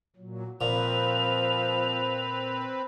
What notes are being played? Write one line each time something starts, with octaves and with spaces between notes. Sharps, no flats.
A#2 F#3
A#2 F3 C4 B4 F7